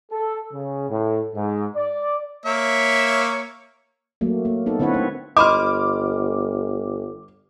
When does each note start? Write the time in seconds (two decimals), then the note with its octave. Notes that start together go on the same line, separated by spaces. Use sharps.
0.11 A4
0.53 C#3
0.89 A2
1.35 G#2
1.76 D5
2.46 A#3 C#5 E5
4.21 F#3 A3 A#3
4.45 A#3
4.66 B3 D#4 A4
4.80 D3 C4 E4 B4 C#5 F#5
4.94 A3 C#5
5.37 G1 D#5 B5 C6 D6 F6